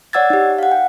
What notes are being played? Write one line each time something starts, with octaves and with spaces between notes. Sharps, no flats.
C#5 D5 F#5 E6 G#6 A6
D#4 G4
F5 F#5
G5